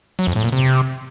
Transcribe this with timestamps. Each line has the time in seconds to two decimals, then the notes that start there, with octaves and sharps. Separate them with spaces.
0.19 F#3
0.27 F2
0.36 A2
0.44 A#2
0.52 C3